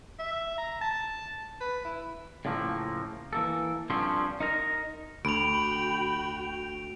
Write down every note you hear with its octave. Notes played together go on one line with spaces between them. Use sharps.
E5
A#5
A5
B4
E4
A2 C#3 F3 A3 A#3
E3 A#3 A4
G2 D3 F3 C4 C#4 C6
D#4 A#4 A#5
D2 F#4 G5 B5 D7 F7